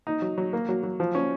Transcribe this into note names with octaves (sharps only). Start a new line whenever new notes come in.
D#4
F#3
F#3
A#3
F#3
F#3
F3
C#4